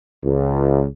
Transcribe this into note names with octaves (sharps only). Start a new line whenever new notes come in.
C#2